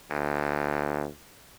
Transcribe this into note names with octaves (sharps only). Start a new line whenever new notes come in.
D2